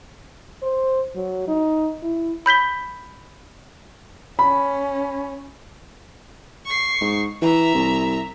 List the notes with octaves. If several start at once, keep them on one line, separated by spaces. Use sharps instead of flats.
C5
F#3
D#4
E4
B5 G6 B6 G7
C#4 B5
C#6 C7
G#2
E3 E5 A#5
C2